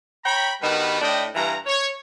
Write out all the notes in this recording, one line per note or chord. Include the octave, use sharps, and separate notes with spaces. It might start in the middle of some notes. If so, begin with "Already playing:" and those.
C#5 G5 A#5 B5
G2 D#3 G3 B3 F#4 B4
A2 D4 E4 D#5 G5
G2 E3 F5 A#5
C#5